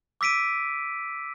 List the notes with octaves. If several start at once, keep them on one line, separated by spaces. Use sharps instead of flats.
D6 E6 B6 D7 D#7